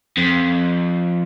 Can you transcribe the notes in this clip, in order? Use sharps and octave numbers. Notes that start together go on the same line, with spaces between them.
F2